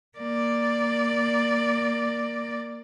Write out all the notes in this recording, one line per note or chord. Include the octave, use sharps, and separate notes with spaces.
A#3 D5